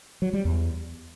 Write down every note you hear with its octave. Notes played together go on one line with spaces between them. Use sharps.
F#3
G3
E2